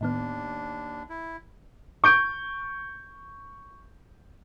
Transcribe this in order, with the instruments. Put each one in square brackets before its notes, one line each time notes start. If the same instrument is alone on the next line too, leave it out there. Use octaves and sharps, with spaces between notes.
[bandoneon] D#2 D4 [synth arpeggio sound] A2 D#3 B3
[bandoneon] E4
[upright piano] C#6 G6 D7